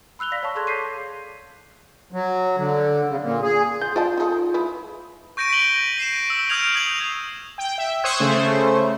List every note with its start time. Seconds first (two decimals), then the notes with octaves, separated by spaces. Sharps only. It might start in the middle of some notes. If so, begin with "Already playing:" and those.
0.19 B5 E6 F#6 F7 G7
0.31 D5 F5 A#6 B6
0.43 C#5 F5 A5 C#6
0.55 G#4 A4 A5 C6 F#6 G#6
0.67 D6 G6 B6 C7 D#7
2.12 F#3
2.57 D3
3.09 C#3
3.21 A#2
3.42 G#4
3.82 F4 G6
3.96 F4 D5 D#5 A5
4.18 D#4 G#4 A4
4.54 G#3 E4 B4
5.37 C#6 G6 A#6 D7 D#7
5.50 B6 D7 D#7 F#7 G7
5.98 B6 C7 D#7 E7
6.30 E6
6.49 D#6 F6 G6 G#6 D7 F7
6.74 D#6 G#6 F#7
7.58 G5
7.78 E5
8.04 C5 C#6 D#6 E6 F#6 G#6
8.20 C#3 A3 C5